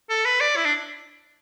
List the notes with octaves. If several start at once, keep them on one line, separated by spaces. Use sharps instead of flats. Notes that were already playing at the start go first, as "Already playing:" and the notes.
A4
B4
D5
E4
D4